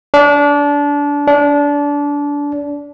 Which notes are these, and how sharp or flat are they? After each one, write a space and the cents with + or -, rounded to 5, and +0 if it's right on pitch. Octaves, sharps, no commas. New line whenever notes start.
D4 -25
D4 -25